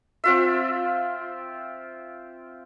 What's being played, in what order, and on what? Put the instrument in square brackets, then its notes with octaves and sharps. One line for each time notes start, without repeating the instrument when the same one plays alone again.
[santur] C4 F4 E5